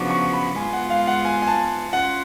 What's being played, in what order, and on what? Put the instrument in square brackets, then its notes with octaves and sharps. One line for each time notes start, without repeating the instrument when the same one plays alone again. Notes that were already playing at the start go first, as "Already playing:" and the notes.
Already playing: [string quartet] C#3 F3 B3 D4 F#4 [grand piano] C#6 D6
[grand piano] C#6
B5
[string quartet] G#2 G#3 B3 F4 [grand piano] G#5
[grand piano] F#5
F5
F#5
G#5
G#5
A5
[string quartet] C#4 F4 [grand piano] F#5